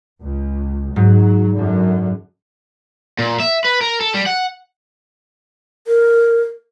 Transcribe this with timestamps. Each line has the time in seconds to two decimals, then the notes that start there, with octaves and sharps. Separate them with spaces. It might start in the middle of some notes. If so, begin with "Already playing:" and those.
0.22 C#2
0.96 G#2 F#3
1.56 F#2 D3
3.19 A#2
3.40 E5
3.65 B4
3.81 A#4
4.01 A4
4.14 G3
4.26 F#5
5.87 A#4